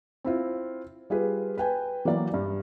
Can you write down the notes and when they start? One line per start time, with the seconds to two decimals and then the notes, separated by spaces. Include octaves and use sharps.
0.24 C4 E4 F4
1.10 G3 F4 G#4 B4
1.57 B4 G5 G#5
2.05 E3 F#3 A#3 D5
2.34 G2